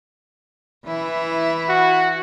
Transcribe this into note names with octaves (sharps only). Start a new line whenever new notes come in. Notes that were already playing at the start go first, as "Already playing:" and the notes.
E3 E4
F#4